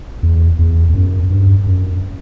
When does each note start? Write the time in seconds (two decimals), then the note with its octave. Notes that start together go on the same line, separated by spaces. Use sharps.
0.23 E2
0.59 E2
0.89 E2
0.95 F#2
1.30 G2
1.67 F#2